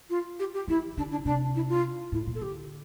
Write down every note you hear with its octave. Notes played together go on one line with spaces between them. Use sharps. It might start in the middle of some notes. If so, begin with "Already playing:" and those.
F4
G4
G4
E3 E4
D3 D4
D4
C3 D4
E4
F4
A2 E4
A#2
A4
D3 G4